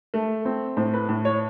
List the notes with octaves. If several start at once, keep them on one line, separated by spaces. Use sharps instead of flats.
A3
C4
A2 C5
B4
A2
C#5